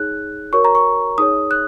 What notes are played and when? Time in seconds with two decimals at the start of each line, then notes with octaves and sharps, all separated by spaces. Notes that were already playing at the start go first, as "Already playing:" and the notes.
Already playing: D#4 G#4 C#5 F#6
0.53 F#4 A#4 C#5 C#6
0.65 A#5
0.75 C#6
1.18 D#4 G#4 C#5 D#6
1.51 F#6